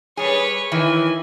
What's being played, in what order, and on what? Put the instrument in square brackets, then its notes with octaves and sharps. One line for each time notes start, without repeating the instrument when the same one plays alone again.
[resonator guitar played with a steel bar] G3 G#4 [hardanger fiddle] B4 C#5
[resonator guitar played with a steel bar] D#3 E3 E4 [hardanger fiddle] G#5